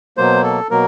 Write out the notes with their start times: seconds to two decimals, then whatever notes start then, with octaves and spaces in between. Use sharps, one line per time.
0.17 B2 F#3 A#3 C5
0.44 A4
0.70 B2 F#3 A#3 A#4